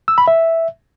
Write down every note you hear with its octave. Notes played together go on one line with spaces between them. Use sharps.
E6
B5
E5